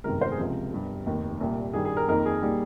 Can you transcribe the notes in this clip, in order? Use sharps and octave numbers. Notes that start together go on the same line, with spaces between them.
G1 F2 C3 D#3 G#3 A#4
C5
G#4
C#2 C3 F3 A#4
G1 G2 G3
F1 D#2 D#3
C2 A#2 G3
G2 D#3 G3 G#4
G#4
A#4
F2 D#3 A#3 D#4 A#4
G#4
A#2 G3 A#3 D#4